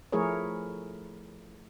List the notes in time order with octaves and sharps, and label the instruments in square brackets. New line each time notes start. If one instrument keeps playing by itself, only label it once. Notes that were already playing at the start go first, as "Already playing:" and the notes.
[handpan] F3 A3 E4 G#4 A#4 C#5